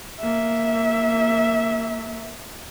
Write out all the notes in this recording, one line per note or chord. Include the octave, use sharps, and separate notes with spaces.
A#3 E5